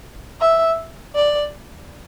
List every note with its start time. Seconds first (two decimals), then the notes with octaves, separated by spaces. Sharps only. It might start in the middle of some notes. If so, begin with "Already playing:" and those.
0.41 E5
1.15 D5